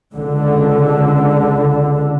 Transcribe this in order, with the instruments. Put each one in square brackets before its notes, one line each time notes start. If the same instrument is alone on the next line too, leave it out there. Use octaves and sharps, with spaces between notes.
[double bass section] C#2 D3